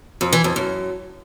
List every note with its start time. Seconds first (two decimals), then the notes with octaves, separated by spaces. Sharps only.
0.21 F2
0.33 E3
0.44 F2
0.56 F#2